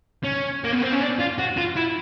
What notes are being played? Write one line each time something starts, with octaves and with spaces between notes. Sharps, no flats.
C#4
A#3
B3
C4
C#4
D4
F4
F#4
F4
E4